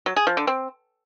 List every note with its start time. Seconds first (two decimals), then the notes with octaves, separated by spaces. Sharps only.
0.06 F#3
0.16 G#4
0.27 F3
0.37 D3
0.47 C4